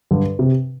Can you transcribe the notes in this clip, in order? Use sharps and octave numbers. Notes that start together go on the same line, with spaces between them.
G2 D3
C3